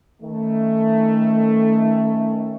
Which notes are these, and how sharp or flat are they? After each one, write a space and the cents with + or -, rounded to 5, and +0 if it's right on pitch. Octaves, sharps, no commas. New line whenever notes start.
D#3 +25 A3 +10 C#4 +5